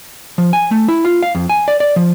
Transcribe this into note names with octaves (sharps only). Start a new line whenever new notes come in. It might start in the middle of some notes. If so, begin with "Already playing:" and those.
F3
G#5
A3
E4
F4
F5
F2
G#5
D5
D5
F3